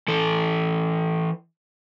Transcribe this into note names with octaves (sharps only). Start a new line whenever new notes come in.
E3 A4